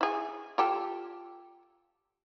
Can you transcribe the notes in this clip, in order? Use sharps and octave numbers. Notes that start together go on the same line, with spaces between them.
E4 G#4
F4 G4 A4